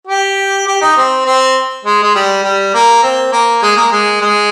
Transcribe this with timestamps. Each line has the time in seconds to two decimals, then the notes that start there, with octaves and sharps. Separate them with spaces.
0.07 G4
0.67 G4
0.81 D#4
0.97 C4
1.25 C4
1.85 G#3
2.02 G#3
2.15 G3
2.43 G3
2.74 A#3
3.03 C4
3.32 A#3
3.62 G#3
3.76 A#3
3.91 G#3
4.21 G#3